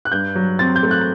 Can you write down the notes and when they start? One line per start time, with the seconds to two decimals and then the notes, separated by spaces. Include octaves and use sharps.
0.05 F#6
0.12 G2 G6
0.35 F#3
0.59 C4 A6
0.76 G6
0.83 A3
0.91 F#6